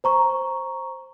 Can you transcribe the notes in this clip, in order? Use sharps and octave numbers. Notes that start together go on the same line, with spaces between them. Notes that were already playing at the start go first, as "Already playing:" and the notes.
C5 A#5 C#6